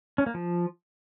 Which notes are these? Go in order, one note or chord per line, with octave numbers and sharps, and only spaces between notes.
C#4
A#3
F3